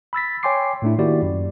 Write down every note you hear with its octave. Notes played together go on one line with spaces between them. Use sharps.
B5 E6 A6 B6
C#5 G5 G#5 C6 D6 C7
A2 A3 D4 E4
D#3 A#3 E4 F#4 G4 D5
F#2